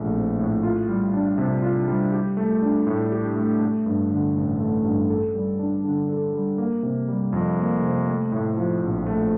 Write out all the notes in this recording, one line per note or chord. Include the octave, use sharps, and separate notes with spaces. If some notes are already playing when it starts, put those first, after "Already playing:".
Already playing: A#1 A2 A3
C4
A2
F4
G3
D4
C3
F4
G3
G4
A3
D4
A2
G4
A3
A3
G2
D3
A1
A3
G2
A4
G3
D4
D3
A4
G3
A#3
C3
G3
F2
A#3
C3
A3
A2
F3
A#1
A3